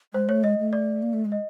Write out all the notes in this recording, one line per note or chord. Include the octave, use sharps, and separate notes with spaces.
G#3 C5
A3 C#5
G#3 D#5
A3
D5
A#3
A3
G#3
D#5